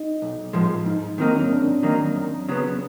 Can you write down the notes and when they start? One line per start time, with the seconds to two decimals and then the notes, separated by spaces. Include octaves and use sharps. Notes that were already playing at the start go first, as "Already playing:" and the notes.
Already playing: D#4
0.22 B1
0.53 A2 F3 G#3
0.86 G#2 D#4
1.18 D#3 F#3 A#3 C4 D#4
1.35 C#4
1.51 G#2 D4
1.83 D#3 F#3 A#3 D#4
2.16 F#2
2.49 C#3 F#3 B3